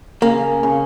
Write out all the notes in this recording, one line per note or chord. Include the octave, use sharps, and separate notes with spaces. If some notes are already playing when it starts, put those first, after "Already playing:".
C#3 A#3
C#3